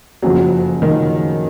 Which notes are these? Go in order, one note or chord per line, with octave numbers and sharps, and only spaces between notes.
F#1 F2 C#3 F3 F#3
D#3